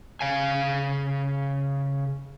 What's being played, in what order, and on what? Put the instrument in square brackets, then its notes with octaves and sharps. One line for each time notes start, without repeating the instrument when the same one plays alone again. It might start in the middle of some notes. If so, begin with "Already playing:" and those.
[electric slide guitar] C#3 F5 G#5